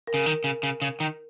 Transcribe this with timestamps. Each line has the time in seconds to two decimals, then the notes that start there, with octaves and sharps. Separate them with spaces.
0.07 A#4
0.14 C#3
0.26 D#3
0.44 C#3
0.63 C#3
0.82 C#3
1.00 D#3